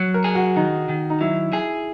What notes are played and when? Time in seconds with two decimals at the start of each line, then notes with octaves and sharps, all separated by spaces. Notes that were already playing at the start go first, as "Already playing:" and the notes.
Already playing: F#3
0.14 A#4
0.24 G#4
0.35 F#4
0.56 D#3 D#4
0.89 D#3
1.10 D#4
1.21 F#3 E4
1.53 G#4